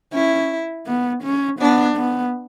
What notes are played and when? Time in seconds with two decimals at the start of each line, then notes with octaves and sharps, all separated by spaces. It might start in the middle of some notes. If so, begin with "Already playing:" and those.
0.12 C#4 E4
0.87 B3
1.24 C#4
1.60 B3 D4
1.97 B3